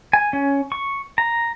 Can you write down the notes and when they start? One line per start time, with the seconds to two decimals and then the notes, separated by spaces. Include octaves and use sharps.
0.13 G#5
0.33 C#4
0.72 C#6
1.18 A#5